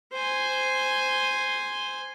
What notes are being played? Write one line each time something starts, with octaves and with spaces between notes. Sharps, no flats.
C5 G#5